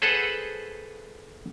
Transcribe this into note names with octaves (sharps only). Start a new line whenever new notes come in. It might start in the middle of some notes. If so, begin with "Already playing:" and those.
G#4 A4 B4 C5 F#5